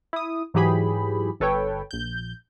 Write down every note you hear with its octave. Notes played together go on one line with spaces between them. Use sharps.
E4 D#6
G#2 E3 F#3 G4 G#4 B5
G1 A4 B4 C#5 G5
A#1 G6